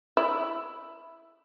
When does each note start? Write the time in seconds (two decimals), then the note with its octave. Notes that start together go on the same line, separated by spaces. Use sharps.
0.17 E4